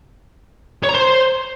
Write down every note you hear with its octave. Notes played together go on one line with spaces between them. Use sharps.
C#5
A#5
C5